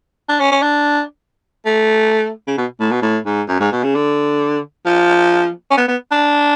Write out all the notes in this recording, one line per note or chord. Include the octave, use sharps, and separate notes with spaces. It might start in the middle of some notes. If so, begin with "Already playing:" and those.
D4
C#4
C#4
D4
A3
C#3
B2
A2
B2
A2
G#2
F#2
G#2
B2
C#3
D3
F3
C#4
B3
B3
D4